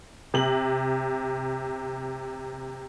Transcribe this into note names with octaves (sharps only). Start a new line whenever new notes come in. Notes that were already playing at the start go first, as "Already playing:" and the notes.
C3 F#7